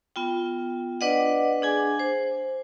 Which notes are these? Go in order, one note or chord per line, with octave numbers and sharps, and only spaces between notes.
B3 F4 G5
D4 B4 D5 D#5 F#5
D4 G#4 G#5
C5